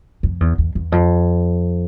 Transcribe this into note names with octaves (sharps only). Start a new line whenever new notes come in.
F2
E2
E2
E2
F2